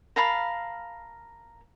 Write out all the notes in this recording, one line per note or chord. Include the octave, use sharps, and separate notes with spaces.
A#4 F5 A5 B5